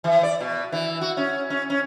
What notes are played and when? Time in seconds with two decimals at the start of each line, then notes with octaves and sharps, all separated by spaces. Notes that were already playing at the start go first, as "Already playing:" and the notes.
0.04 E3
0.23 D5
0.41 B2
0.72 E3
1.01 F#4
1.17 C#4
1.50 C#4
1.70 C#4